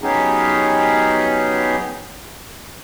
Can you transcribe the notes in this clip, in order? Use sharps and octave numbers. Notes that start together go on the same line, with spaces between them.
F#3 B3 C#4 D#4 G4 G#4